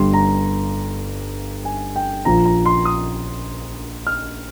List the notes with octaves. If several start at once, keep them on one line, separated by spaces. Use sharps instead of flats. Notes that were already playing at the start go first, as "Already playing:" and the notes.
Already playing: G1 G2 G3 C6
A#5
G#5
G5
A#1 A#2 F3 A#5
A#5
C6
D#6
F6